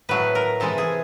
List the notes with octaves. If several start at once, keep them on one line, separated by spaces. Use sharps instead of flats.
A2 F#3 A3 B4
A#4
C3 E3 G#3 A4
G#4